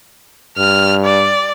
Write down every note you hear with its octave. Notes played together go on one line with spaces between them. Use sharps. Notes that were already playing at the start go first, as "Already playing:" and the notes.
G2 F6
D5